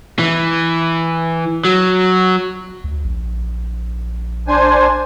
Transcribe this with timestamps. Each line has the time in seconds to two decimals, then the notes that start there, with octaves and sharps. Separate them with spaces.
0.19 E3
1.65 F#3
2.84 D2
3.04 A#1
4.48 D4 C5 G#5